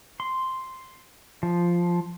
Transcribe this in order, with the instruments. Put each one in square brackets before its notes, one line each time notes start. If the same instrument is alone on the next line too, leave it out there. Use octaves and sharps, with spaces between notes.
[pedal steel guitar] C6
F3